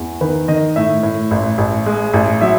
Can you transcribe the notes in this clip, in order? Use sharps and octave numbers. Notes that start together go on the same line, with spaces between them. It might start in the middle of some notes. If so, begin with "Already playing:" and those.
Already playing: E2
D#3 B4
D#3 D#5
A2 E5
A2
A1
A1
G#3
A1
F#3 E5